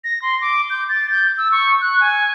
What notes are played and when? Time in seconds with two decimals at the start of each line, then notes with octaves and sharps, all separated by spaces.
0.04 A#6
0.22 C6
0.41 D6
0.70 G6
0.89 A6
1.11 G6
1.38 E6
1.52 C#6
1.81 F#6
2.01 G#5